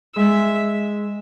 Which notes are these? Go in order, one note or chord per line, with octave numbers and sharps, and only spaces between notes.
G#3 E5